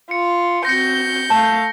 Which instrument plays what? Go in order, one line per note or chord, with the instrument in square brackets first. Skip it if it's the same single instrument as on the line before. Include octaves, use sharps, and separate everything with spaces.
[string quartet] F4 [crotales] C#7
[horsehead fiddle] C4 F#4 [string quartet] G6 [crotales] A#6 C#7
[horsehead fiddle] A3 F5 [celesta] A5